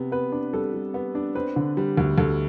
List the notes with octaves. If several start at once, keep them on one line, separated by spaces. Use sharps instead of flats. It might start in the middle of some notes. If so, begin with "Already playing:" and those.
Already playing: C3 B3
B3 B4
D4
G3 A4
G3
B3
D4
C4 B4
D3
G3
D2
D2 A4